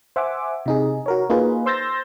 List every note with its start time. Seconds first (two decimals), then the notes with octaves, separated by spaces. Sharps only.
0.16 C5 E5 F#5 G#5 D6
0.66 C3 D#4 G#4
1.06 F#4 A#4 C#5
1.30 A#3 D#4 F4 G#4 A#4 B4
1.66 C5 C6 E6 G6 A6 A#6